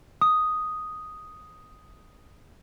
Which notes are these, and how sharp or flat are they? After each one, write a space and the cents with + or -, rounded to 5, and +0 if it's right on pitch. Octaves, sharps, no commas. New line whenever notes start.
D#6 +0